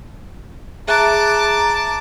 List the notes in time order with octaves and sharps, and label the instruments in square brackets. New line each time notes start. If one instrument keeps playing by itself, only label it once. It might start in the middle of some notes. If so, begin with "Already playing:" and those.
[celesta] G#4 E5 F#6 [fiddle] A5 D6 [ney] A#5